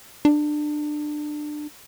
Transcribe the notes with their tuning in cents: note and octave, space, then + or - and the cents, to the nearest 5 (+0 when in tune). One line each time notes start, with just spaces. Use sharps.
D4 +25